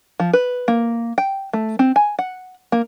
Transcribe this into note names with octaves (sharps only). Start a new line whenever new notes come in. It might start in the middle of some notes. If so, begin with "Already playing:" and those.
F3
B4
A#3
G5
A3
C4
G#5
F#5
A#3